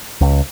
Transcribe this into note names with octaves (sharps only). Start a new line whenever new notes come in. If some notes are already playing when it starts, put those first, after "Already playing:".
C#2